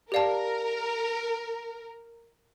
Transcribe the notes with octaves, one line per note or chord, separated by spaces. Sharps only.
G4 A#4 D5 F5 A5